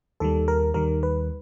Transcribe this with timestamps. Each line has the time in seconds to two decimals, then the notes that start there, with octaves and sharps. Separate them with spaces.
0.20 D#2 D#3 G3 A4
0.48 A#4
0.74 D#2 D#3 G3 A#4
1.03 B4